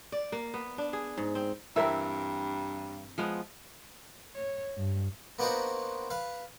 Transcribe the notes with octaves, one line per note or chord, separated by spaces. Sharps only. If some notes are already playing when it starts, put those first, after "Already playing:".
D5
A#3
B3
D4
G#4
G#2
C4
G2 E3 C4 A#4 E5
F3 G#3 B3
C#5
G2
A#3 B3 D4 D#4 F#4 C5
B4 F5